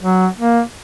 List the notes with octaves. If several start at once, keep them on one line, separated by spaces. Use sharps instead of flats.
F#3
A#3